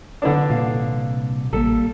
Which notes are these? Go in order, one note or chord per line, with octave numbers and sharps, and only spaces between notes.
D3 B3 D4
C2 A#2 F5
A1 G3 A#3 A4